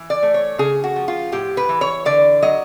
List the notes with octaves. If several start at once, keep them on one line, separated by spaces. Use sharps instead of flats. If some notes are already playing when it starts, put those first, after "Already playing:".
Already playing: E3
D5
A3
C#5
C#3 G#4
F#4
F3
F4
A2 G4
B4
E3
C#5
D3 D5
F#3 D#5